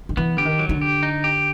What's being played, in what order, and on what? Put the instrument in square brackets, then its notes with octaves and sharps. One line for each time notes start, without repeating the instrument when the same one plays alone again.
[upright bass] D#3
[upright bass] E3 [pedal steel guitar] B3
[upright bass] D3 [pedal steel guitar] G4
[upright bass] D#3
[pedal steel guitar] F#3
[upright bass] D#3
D3
[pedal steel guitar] G4
D#4
G4